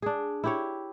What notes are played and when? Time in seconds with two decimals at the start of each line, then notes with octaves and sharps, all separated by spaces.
0.02 D4 G#4
0.44 E4 G4 C#5